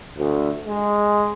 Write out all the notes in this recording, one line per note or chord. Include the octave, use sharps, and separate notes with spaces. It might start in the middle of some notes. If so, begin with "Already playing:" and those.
D2
G#3